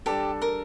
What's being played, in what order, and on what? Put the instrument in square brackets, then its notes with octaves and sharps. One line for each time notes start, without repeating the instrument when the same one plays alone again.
[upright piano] G3 D4 A4 [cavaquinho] G4
[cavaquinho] A#4